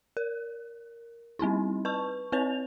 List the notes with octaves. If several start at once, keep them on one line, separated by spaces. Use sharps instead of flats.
A#4
G3 C4 D#4 E4
B4 A5 C#6
C4 B4 C#5 F7